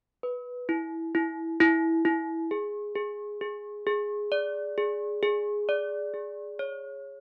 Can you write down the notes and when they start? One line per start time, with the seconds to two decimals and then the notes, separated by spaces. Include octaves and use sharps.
0.23 B4
0.69 E4
1.15 E4
1.60 E4
2.05 E4
2.51 G#4
2.95 G#4
3.41 G#4
3.87 G#4
4.32 D5
4.78 G#4
5.23 G#4
5.69 D5
6.14 G#4
6.59 C#5